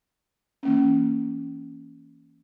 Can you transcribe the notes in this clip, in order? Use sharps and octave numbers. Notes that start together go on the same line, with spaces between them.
E3 A#3 C#4